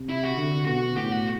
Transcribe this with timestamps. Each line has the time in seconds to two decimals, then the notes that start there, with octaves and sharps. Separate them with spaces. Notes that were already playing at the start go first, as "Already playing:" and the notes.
Already playing: C3
0.09 E4
0.23 F#4
0.38 D3
0.67 B2 F#4
0.96 A2 G4
1.12 F#4